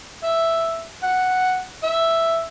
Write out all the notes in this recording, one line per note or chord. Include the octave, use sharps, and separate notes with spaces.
E5
F#5
E5